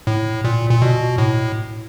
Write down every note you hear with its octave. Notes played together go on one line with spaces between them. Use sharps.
A2
A#2
A#2
B2
A2